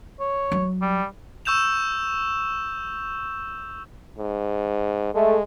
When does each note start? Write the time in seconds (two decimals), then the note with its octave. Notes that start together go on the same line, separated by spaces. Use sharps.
0.20 C#5
0.52 F#3
0.82 G3
1.45 C#6 E6 G6 E7 F7
4.19 G#2
5.14 G#3 A3